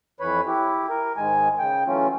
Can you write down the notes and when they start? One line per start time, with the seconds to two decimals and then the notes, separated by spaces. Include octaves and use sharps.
0.20 F2 E3 B4 C#5 B5
0.47 E4 G4
0.90 A#4
1.17 G#2 D#3 G#3 G#5
1.59 C#3 G5
1.87 E3 F#3 A3 C#4 F4